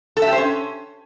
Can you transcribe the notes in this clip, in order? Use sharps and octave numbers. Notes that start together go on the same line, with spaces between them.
A4
E5
G4
C5
C#4